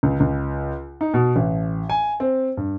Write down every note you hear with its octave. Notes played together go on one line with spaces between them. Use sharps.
C#2
C#2
D#4
B2
A1
G#5
C4
G2